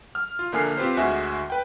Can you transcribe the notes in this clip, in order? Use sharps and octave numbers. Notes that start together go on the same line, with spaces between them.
F6
F4
A#1 D3 A#3 G#5 F6 C7
C4 F4 G4 B4 C5
D2 G#3 F#4 E5 G#5
B4 G5